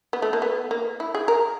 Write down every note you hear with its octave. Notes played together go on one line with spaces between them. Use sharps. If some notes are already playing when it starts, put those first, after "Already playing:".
B3
A3
A#3
B3
A#3
E4
G#4
A#4